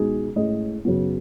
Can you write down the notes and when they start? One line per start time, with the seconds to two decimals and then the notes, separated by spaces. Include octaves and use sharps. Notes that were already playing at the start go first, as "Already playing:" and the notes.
Already playing: C#2 B2 G#3 D#4 G#4
0.36 A2 G#3 C#4 G#4 D#5
0.85 F#2 C#3 F#3 B3